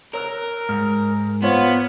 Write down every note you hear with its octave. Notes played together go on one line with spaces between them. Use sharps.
A#4 C#5 E6 F#6
G#2 F6
B3 F4 C5 C#5